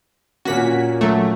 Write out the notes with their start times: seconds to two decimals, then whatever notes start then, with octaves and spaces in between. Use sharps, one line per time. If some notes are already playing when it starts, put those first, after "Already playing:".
0.45 A#2 A#3 C#4 F#4 B6
1.01 F#3 A3